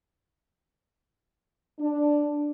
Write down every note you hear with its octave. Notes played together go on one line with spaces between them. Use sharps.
D4